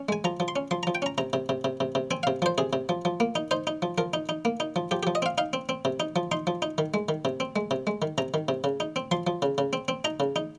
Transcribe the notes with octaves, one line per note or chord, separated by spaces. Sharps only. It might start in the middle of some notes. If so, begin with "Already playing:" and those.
Already playing: C#4
G#3 G#5
F3 A#5
F3
C6
C#4
F3 C6
F3 A#5
G5
C#4 A#5
C3 A#5
C3
C3
C3
C3
C3
C4 G#5
C3 F5
F3 C5
C3 G#4
C3
F3
F3
A#3
D#4
D#4 C5
D#4
F3
F3 A#4
D#4
D#4
A#3
D#4
F3
F3 G4
F3 G4
D#5
C4 F5
D#4 F5
C4
C4
C3
D#4
F3
D#4 C6
F3
D#4
D#3
G#3
D#3
C3
C4
G#3
C3
G#3
D#3
C3 A#5
D#3
C3
C#3
D#4
C4
F3 C6
F3
C#3
C#3
C4
C4
D#4 A#5
C#3
D#4